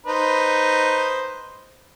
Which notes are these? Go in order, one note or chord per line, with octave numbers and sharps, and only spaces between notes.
D#4 B4 C5